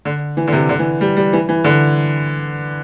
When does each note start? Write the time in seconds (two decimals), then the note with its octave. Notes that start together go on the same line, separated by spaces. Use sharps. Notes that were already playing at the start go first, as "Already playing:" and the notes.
0.05 D3
0.37 E3
0.47 D3
0.53 C3
0.69 D3
0.79 E3
1.01 G3
1.17 G3
1.33 E3
1.49 E3
1.64 D3